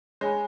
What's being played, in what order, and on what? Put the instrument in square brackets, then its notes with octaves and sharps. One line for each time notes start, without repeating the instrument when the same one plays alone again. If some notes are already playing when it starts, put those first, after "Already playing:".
[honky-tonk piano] G#3 [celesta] C#5 G#5 B5